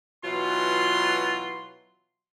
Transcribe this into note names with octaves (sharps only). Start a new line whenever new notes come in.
B2 E3 F#3 F4 C6